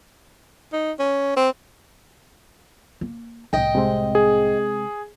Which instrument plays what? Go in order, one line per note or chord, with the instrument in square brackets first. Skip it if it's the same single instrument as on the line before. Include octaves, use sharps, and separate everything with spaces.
[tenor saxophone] D#4
C#4
C4
[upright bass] A#3
[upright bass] C2 A2 [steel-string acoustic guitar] D#5 G5
[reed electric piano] C3 G#3 C4
[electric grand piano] G#4